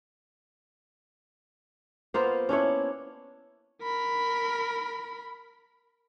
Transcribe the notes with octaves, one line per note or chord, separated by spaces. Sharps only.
A#3 B3 F4 C5
C#4 D4 E4 C#5
A#4 B5